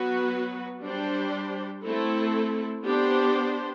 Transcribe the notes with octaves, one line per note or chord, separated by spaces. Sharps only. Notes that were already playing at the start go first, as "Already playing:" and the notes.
Already playing: F#3 B3 F#4 B4
G3 D4 G4 C5
A3 C4 E4 A4
B3 D4 G4 C5